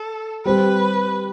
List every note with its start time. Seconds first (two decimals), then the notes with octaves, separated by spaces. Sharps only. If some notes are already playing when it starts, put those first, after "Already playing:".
Already playing: A4
0.45 G3 C4 G4 B4